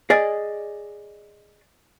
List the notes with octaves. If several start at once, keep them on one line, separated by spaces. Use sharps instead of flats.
G#4 D5 D#5